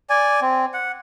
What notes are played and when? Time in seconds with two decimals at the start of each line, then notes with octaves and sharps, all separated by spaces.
0.10 D5 G#5
0.41 C4
0.74 F#5